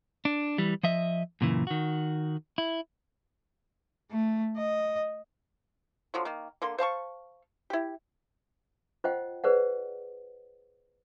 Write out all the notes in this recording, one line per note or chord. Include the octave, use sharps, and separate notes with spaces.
D4
E3 G3
F3 D#5 E5
F#2 A#2 C#3 E3
D#3 F#4
E4
A3
D#5
D3 F3 F#3
D#3 A#3
D3 A#3 C6
C5 F5 A5 C#6
E4 G4
F4 C5 D#5 F#5 G5
G#4 B4 C5 D5 F#5